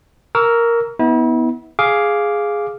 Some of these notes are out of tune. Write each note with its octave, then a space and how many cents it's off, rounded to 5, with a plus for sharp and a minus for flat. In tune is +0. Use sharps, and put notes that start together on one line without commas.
A#4 +0 C#6 +35 E6 +5
B3 +0 E4 -40
G#4 +0 F5 +0 D6 -5